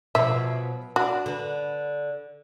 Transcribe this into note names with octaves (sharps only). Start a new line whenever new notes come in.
B2 F3 F#3 E5
D4 F#4
D3 B4